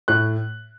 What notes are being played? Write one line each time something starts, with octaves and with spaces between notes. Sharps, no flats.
A2 F#6